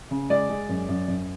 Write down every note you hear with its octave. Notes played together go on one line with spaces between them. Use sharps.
C#3
G#3 D5
G#3
F#2
F#2
F#2